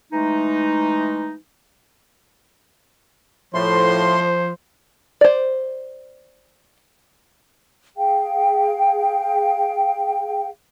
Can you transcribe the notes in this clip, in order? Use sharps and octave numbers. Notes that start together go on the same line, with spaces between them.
E3 G#3 A3 D#4
A2 F3 C5 C6
C5 D5
G#4 F5 G5